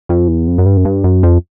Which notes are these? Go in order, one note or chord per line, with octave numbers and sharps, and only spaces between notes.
F2
E2
F2
F#2
G2
F#2
G2
F#2
F2